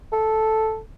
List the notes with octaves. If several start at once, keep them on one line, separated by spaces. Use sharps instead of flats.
A4